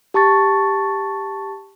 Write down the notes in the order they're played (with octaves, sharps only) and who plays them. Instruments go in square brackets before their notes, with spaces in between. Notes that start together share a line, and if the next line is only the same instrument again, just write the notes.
[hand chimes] G4 A5 C#6 A6